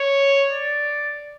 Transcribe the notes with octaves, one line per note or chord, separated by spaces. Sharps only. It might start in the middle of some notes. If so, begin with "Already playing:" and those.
Already playing: C#5
D5